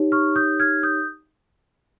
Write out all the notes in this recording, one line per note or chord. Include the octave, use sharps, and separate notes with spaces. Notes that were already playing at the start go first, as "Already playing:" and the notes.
Already playing: D#4 G4 C#5
C#6 F6
D#6 G6
F6 G#6
D#6 G6